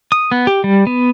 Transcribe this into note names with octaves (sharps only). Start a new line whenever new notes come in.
D#6
B3
G4
G3
B3